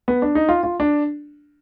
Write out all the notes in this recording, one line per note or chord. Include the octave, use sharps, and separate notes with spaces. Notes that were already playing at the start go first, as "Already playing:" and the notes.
B3
D4
D#4
F4
F4
D4